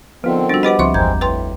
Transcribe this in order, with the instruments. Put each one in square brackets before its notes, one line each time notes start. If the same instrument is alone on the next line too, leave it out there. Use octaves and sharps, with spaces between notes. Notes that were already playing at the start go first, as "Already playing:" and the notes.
[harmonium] D3 D#3 C4 [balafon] F3 [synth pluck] B3 F4
[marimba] G3 A6 [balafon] D4 F#4
[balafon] G4 B4 C5 [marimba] D#5 F#5 [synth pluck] B5 D6
[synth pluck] C#2 F3 C4 [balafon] E5 C6 C#6
[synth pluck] G#1 E2 [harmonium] G#3 C4 [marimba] A#5 G6 G#6
[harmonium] A2 [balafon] B4 G5 C6